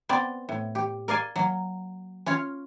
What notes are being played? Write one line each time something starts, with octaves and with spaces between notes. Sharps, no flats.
B3 C4 D5
A2
G4
A#4 D5 F5 G#5
F#3 A#3
C#4 F4 C#5 F5